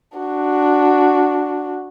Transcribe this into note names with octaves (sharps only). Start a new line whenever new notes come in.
D4 F#4